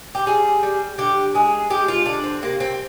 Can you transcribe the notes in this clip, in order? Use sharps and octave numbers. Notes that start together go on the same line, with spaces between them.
G4
G3 G#4
G3
D3 G4
G#3 G#4
G#3 G4
F4
D3 D4
C4
C3 A#3
C4